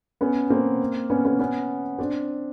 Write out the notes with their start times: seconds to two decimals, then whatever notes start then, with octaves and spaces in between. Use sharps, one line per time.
0.21 B3 C#4
0.50 A#3 C4
1.10 B3 C#4
1.25 B3 C#4
1.39 B3 C#4
1.98 C4 D4